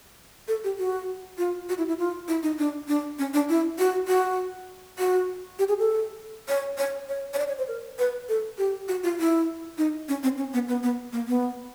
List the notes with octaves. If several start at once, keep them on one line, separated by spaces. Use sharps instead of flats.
A4
G4
F#4
F4
F#4
E4
E4
F4
E4
D#4
D4
D4
C#4
D4
E4
F#4
F#4
F#4
G4
G#4
A4
C#5
C#5
C#5
C#5
D5
C#5
C5
A#4
B4
A4
G4
F#4
F4
E4
D#4
C#4
C4
C#4
B3
B3
B3
A#3
B3